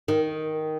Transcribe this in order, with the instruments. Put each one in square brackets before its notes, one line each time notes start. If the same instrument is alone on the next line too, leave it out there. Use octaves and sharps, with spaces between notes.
[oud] D#3